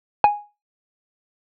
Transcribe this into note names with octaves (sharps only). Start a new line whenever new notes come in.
G#5